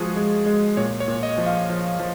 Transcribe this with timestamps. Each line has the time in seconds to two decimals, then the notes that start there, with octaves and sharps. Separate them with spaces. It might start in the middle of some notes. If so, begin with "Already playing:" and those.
Already playing: F3 G#3 F4 F#4 G#4
0.16 G#3
0.46 G#3
0.77 A#2 C#5
1.00 C#5
1.08 A#2
1.23 D#5
1.38 F3
1.46 F5
1.69 F3
1.99 F3